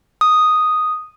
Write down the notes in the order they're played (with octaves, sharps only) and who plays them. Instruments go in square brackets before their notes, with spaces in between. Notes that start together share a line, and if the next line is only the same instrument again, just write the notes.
[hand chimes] D#6